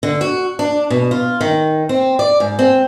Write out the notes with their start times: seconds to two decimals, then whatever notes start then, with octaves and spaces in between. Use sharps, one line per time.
0.03 D3
0.21 F#4
0.59 D4
0.90 B2
1.11 F4
1.41 D#3
1.89 C4
2.19 D5
2.40 G#2
2.59 C4